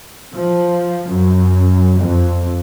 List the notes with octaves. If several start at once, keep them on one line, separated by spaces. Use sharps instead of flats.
F3
F#2
F2